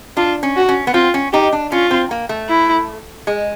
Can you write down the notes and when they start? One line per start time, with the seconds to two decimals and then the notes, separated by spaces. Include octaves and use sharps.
0.17 D4 F4
0.43 C#4
0.56 F#4
0.69 C#4
0.87 B3
0.94 C4 F4
1.14 C#4
1.33 D#4 G4
1.52 D4
1.72 C#4 F4
1.91 C4
2.11 A#3
2.29 A3
2.49 E4
3.27 G#3